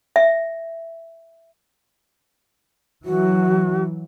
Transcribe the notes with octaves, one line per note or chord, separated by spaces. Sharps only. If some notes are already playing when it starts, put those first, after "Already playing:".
E5
E3 F#3 F#4